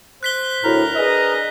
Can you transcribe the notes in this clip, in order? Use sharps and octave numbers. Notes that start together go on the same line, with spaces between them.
C5 F#6 B6 G7
D2 A2 A#4 A#5
D4 G#4 B4 D#5